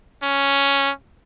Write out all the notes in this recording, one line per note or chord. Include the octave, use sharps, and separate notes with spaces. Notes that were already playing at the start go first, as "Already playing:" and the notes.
C#4